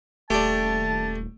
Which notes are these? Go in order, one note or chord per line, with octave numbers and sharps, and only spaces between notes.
D#1 A3 D4 G4 A5